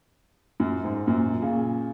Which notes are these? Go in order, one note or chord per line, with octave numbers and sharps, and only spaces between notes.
F#2
G#2
F#2 A#2
A#2 C#3